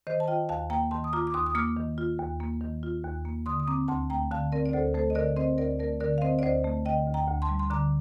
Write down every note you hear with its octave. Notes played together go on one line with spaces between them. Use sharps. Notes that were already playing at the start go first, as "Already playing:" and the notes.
D#3 C5 D#5
A5
F4 D#5 G5
D#2 F5 A5
A#3 G5 A#5
D#3 A5 C6
D#6
F4 A#5 D6
D6
D#2 C6 D#6
D#6
A#3 D6 F6
D#3
F4
D#2
A#3
D#3
F4
D#2
A#3
D3 C6 D#6
D#6
C4 A#5 D6
D2 A5 C6
A3 G5 A#5
D3 F5 A5
C4 A#4 D5
D5
D2 A4 C5
A3 A4 C5
D#5
D3 A#4 D5
C4 C5 D#5
D2 A#4 D5
A3 A#4 D5
D3 A#4 D5
F5
C4 C5 D#5
D5
D2 C5 D#5
A3
D3 D#5 G5
D2
G5 A#5
D2
A5 C6
G3
C6
D3 A#5 D6